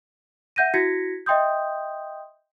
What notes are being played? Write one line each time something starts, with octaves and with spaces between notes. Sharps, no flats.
E5 F#5 G6 A#6 D#7
E4 F#4 G#6 A#6 B6 C#7
D#5 E5 G5 C6 D#6 G6